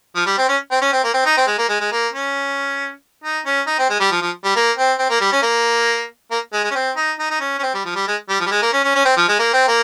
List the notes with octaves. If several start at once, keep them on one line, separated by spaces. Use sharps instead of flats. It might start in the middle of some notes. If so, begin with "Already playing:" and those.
F3
G3
C4
C#4
C4
C#4
C4
A#3
C4
D#4
C4
G#3
A#3
G#3
G#3
A#3
C#4
D#4
C#4
D#4
C4
G#3
G3
F3
F3
G3
A#3
C4
C4
A#3
G3
C#4
A#3
A#3
G#3
G#3
C#4
C4
D#4
D#4
D#4
C#4
C#4
C4
G3
F3
G3
G#3
G3
F3
G3
G#3
A#3
C#4
C#4
C#4
C4
F3
G#3
A#3
C4
A#3